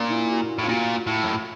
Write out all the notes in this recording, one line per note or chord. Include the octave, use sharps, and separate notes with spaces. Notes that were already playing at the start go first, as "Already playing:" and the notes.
Already playing: A#2 C#4 D4
E4
F#4
A2
F4
A#2 F#4
A2
F#2